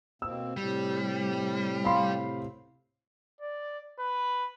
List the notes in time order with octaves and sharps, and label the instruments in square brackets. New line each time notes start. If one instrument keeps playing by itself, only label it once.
[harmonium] B2 A#3 C4 [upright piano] E6
[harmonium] A2 C3 [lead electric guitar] G3
[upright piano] F5 B5 C6
[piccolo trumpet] D5
B4